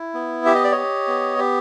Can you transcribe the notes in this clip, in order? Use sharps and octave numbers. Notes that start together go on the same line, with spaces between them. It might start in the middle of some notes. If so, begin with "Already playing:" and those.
Already playing: E4
B3
G4 E5
D#5
D5
G4 C#5 D#5
B3
G4